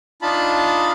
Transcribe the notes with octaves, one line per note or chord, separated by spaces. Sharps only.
D4 D#4 F4 A5 B5